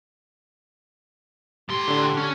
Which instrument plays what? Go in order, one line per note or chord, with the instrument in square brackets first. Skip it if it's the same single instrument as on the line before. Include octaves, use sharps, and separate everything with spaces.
[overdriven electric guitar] A2 C6 [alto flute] G4
[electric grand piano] D3 D4
[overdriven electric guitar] C#4